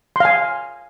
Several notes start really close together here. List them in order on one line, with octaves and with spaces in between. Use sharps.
C6 F5 G#5